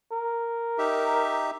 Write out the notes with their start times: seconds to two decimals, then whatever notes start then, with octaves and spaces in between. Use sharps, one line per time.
0.12 A#4
0.78 D#4 G4 E5